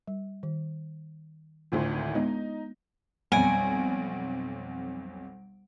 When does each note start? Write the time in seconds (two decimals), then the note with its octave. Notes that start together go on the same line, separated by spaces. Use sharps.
0.07 G3
0.43 D#3
1.72 G#1 D2 A2 F4 C5 C6
2.15 G#3 B3 D4 D#4
3.32 B1 F2 G3 F#5 G#5 D7